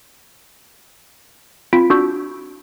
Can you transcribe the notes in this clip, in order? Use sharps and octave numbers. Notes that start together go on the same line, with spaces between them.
C4 F4 B5 B6 D7
D4 F#4 C#6 E6 G6